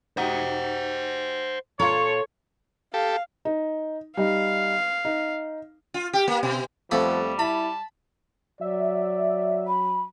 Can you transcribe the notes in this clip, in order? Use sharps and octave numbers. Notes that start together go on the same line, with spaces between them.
D#4 F#4 G4 C5 F#5
A#2 F4 A4 C#5
G4 A4 F5
D#4
G3 D#4 F5
D#4
F4
G4
A#3
B2
F2 F3 G3 A3 B3 B5
E4 A5 B5
F#3 D5 E5
B5